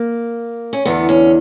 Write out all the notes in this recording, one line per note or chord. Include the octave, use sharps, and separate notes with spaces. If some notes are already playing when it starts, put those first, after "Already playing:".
Already playing: A#3
C#4
E2 D3 B3
C#4